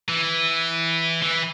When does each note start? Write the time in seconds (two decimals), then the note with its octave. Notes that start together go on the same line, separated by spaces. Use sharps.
0.08 E3
1.23 E3